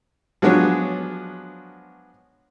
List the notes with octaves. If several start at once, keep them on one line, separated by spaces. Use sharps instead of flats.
F3 F#3 G#3 B3 D4 C#5